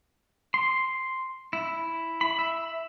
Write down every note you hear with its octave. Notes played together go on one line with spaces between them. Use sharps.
C6
E4
B5
E5